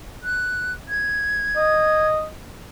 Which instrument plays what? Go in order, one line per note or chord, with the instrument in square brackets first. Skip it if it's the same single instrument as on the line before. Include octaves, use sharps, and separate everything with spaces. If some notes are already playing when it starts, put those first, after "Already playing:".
[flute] F#6
G#6
[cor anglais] D#5